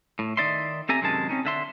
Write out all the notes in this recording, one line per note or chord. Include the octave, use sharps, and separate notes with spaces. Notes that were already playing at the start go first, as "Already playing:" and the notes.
A2
D#3 D#4 D5 E5 C6
C4 G4 A4 E5 G#5 A#5
F#2 C3 D#3 G#3 A5
C4 C#4 D#4
D3 E5 C6